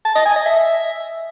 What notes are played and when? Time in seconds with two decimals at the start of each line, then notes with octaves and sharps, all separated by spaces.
0.05 A5
0.15 D#5
0.26 G#5
0.36 D#5
0.46 E5